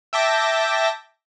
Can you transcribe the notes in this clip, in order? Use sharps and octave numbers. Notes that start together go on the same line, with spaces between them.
E5 G5 A5 D6 A#6